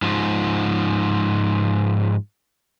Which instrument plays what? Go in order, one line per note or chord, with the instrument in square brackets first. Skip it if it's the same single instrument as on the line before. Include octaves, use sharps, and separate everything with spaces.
[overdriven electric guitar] G#2 F3